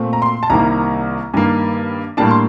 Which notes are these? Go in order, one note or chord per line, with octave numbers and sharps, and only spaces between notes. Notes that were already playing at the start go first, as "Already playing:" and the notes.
Already playing: A#2 A3 C4
A#5
C6
A5
C2 C3 D#3 G3 A#3 A#5
G2 D#3 A#3
A2 G3 A#3 D4 A5
C6